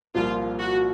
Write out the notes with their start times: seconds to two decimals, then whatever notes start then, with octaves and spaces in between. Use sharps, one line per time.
0.15 C2 A#2 F3 F4
0.59 F#4